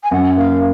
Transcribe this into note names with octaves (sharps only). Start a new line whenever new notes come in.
G#5
F#2 F#5
A#3 F5